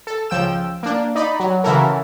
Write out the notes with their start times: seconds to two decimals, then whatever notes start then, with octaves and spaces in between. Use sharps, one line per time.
0.07 A4
0.30 C#2 F3 G5 E6 E7
0.83 A#3 D4
1.15 D#4 D5 B5
1.40 F#3
1.64 C#3 E3 E4 F#4 A4 A#4